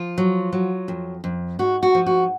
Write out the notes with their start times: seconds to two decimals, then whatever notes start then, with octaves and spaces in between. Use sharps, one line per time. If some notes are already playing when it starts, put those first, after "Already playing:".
Already playing: F3 F4
0.18 F#3
0.53 F#3
0.88 F2
1.24 F2
1.59 G#2 F#4
1.83 F#4
1.95 F3
2.06 F#4